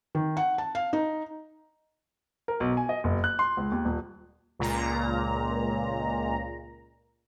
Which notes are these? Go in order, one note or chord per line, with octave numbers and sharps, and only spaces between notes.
D#3
F#5
A5
F5
D#4
A#4
B1
G#5
D#5
F#1
F#6
C6
C#2
D#2
D#1
C#2 A#2 A#5